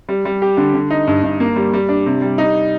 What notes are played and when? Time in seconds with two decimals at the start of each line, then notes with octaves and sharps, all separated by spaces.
0.09 G3
0.25 G3
0.42 G4
0.57 D3
0.74 D3
0.90 D#4
1.07 G2
1.23 G2
1.40 A#3
1.56 G3
1.73 G3
1.89 D4
2.06 C3
2.22 G3
2.38 D#4